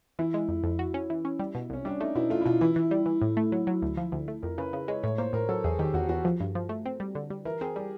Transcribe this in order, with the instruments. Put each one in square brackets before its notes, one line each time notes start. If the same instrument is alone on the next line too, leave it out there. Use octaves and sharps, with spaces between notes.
[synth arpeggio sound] E3 [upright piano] E4
[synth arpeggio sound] G#3
F2
F2
F#4
C#4
E3
C#4
G3
B2
[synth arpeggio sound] C2 [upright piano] C#4
[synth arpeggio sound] G3 [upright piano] D4
[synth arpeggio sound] A3 [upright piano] D#4
[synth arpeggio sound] B2 [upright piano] E4
[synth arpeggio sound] A3 [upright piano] F4
[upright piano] E4
[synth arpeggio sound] B2 [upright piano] F4
[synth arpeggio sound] E3 [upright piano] E4
[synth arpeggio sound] E3
G3
E3
A2
A3
F#3
F#3
D2
F3
D2
A3
[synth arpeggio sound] F2 [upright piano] A#4
[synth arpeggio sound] C#3 [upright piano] B4
[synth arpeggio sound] C#3
[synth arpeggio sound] G#3 [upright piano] C#5
[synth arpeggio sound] A2 [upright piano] C#5
[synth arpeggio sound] A#3 [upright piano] C5
[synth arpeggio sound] A2 [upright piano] A#4
[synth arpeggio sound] F#3 [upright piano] A4
[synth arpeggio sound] E2 [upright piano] G#4
[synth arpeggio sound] D#3 [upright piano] G4
[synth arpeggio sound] E2 [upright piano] F#4
[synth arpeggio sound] E2 [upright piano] F#4
[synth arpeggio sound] F3
G2
F3
A3
C4
G3
D3
G3
[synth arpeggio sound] E3 [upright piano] A#4
[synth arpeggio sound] C4 [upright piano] G#4
[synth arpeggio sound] G3 [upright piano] G4